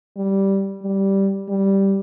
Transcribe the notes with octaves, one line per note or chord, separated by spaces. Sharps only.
G3
G3
G3